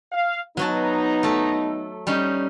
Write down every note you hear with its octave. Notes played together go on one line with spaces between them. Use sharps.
F5
F#3 B3 D#4 F#4 A5
A3 A4
G3 C#4 D#4